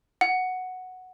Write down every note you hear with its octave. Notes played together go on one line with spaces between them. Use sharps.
F#5